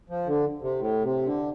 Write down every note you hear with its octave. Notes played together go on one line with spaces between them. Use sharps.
F3
D3
C3
A2
C3
D3